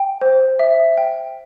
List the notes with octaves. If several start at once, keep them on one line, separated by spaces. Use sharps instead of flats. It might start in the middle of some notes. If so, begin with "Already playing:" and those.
Already playing: G5
C5
E5
G5